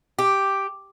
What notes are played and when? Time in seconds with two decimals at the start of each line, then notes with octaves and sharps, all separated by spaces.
0.19 G4